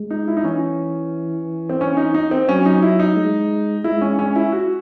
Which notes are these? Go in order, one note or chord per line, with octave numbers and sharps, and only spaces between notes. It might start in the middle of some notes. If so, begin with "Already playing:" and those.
Already playing: G#3
D#4
E4
D#4
E3 C#4
C4
C#4
D#4
D#4
C4
F#3 C#4
D#4
E4
D#4
G#3
G#3 E4
C#4
C#4
E4
F#4